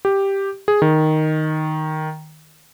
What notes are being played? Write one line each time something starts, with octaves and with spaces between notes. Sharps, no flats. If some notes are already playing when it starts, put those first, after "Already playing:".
G4
G#4
D#3